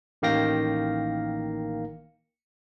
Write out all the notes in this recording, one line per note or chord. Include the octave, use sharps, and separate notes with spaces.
A1 D#3 A#3 F5 G5 A#6